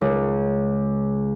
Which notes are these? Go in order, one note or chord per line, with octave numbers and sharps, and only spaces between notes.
C#2